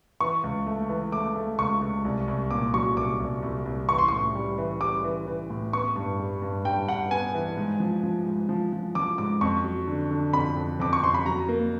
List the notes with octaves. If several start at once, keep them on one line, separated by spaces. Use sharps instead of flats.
E3 C#6
C#2
A3
E3
A3 D6
A3
C#2 C#6
C#2
C2
C2
A#2 D6
F#3 C#6
C2 D6
C2
C2
C2
E3 C#6
C6
A2 C#6
G3
E3
G3 D6
E3
E3
A2
B3 C#6
G2
G3
G2
G2 G5
G2 F#5
B3 G#5
E3
G#2
F3
F3
G#2
F3
F3
F3 D6
G#2 D6
F2 C#6
F#3
D3
D3
F2 B5
F2
F2 D6
C#6
F2 C6
B5
F#3 A#5
A#3